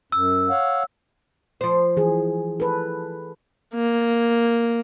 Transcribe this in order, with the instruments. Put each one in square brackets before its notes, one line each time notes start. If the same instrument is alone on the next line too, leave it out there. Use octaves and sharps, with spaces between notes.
[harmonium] F#2 [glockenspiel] E6
[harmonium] C#5 F5 F#5
[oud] F3 C5
[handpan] E3 G#4
A4 B4
[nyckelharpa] A#3